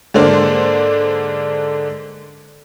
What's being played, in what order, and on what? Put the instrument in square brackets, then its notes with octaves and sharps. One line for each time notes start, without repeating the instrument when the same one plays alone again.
[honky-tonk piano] G#2 D3 A#3 D4 C5